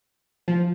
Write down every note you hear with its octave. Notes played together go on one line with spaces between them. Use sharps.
F3